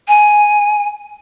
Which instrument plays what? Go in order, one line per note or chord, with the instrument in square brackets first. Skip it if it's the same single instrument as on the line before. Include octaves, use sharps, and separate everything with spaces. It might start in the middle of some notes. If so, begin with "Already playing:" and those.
[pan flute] G#5